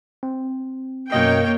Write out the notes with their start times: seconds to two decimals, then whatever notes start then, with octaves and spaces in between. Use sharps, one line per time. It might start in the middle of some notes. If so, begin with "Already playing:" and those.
0.23 C4
1.12 F#2 B2 A#3 C#5 D#5 G5